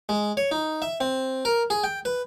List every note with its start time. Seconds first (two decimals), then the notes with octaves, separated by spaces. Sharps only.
0.09 G#3
0.37 C#5
0.51 D#4
0.82 E5
1.01 C4
1.45 A#4
1.70 G#4
1.84 G5
2.05 B4